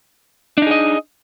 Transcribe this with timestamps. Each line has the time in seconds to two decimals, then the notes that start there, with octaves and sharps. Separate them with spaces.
0.58 D4
0.62 D#4
0.67 G#4
0.71 D#5